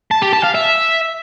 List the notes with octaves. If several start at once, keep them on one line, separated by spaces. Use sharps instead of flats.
A5
G4
A5
F5
E5